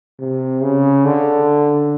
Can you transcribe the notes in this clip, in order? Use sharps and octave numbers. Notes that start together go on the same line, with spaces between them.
C3
C#3
D3